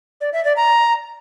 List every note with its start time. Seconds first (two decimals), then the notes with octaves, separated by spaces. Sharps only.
0.21 D5
0.33 E5
0.45 D5
0.56 A#5